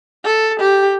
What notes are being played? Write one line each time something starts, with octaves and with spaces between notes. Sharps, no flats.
A4
G4